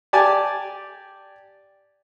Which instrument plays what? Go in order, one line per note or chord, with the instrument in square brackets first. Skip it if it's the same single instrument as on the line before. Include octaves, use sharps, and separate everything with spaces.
[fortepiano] G4 D5 G#5 A5